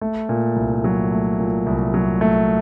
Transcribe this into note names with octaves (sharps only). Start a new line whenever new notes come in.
A3
A#2
C2
F#3
A3
A#2
C2
F#3
A3